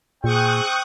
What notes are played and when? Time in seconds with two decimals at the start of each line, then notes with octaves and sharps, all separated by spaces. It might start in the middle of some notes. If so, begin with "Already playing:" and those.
0.24 A#2 C4 G#4 G5 C#6 D#6 F#6